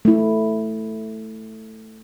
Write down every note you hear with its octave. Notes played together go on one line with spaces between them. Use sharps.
A3 E4